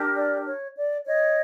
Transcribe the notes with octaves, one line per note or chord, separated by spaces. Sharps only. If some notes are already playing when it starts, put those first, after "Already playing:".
Already playing: D4 G4 A#4
D5
C#5
D5
C#5 D#5